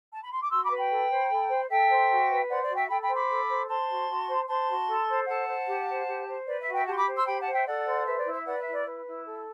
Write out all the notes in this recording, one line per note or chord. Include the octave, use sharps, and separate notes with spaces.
A5
B5
C6
D6
F#4 C6 E6
B5 D6
B4
G5 B5
A4
C5
A4
C5
A4 E5 G5
C5
F#4
B4
C5 D5 F#5
D5
F#4
E5 G5
A4 G5 B5
G5 B5
C5
B5 D6
A4
C5
C5 A5 C6
F#4
F#4
C5
C5 A5 C6
F#4
A4
C5
A4 F#5 A5
C5
G4
C5
G4
C5
B4 D5
E5
F#4
E5 G5
G4 F#5 A5
C6
B5 D6
C5
C6 E6
G4 G5 B5
F#5 A5
C5
E5 G5
A4 D5 F#5
C5
B4 E5
D5
E4
E5
B4 D5 F#5
E5
E4
D5
B4
E4
A4